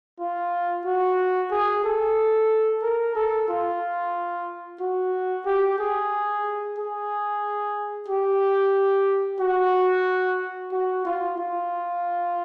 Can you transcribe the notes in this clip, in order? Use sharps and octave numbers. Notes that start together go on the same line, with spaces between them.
F4
F#4
G#4
A4
A#4
A4
F4
F#4
G4
G#4
G#4
G4
F#4
F#4
F4
F4